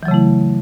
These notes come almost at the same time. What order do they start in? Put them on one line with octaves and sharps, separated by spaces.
E3 F#3 C#3 A3 E4